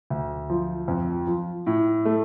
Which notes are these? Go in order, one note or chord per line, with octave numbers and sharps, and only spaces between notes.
D2
F3
F2
F3
A2
A3